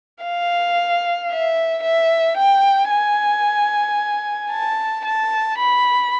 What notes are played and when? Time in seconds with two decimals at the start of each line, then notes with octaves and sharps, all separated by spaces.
0.23 F5
1.30 E5
1.83 E5
2.37 G5
2.91 G#5
4.51 A5
5.05 A5
5.58 B5